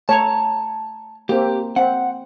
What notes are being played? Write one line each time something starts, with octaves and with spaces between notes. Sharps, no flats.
A3 C#5 A5 A#5
A#3 C4 G4
C4 F#5